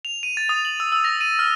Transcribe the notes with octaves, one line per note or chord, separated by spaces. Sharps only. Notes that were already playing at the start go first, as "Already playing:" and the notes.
F7
D#7
A6
D#6
F#7
E6
E6
A#6
D#7
F6